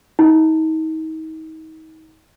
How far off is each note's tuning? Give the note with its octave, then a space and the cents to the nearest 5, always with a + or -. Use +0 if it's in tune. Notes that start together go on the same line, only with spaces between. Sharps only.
D#4 +35